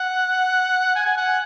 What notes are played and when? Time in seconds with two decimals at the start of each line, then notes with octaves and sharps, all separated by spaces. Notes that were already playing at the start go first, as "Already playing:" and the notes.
Already playing: F#5
0.96 G#5
1.06 G#5
1.17 F#5